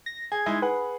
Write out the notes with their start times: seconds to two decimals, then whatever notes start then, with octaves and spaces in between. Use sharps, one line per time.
0.06 A#6
0.32 G#4 G#6
0.46 G#3 D#4 E4
0.62 G#4 B4 F#5